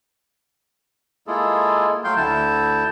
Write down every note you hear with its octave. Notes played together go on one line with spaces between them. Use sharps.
G#3 A#3 E4 F4 G#4 A4
F#3 A3 F5 G5 C6 G6
D2 D3 E4 A5 G6